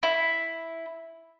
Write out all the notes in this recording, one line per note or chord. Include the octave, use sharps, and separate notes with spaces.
E4